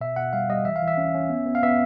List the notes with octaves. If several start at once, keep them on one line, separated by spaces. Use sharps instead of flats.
B2 E5
B2 F#5
G3 F5
G3 D#5
E3 E5
F5
E3
E5
C#4
C#4
B3
B3
F5
B3 E5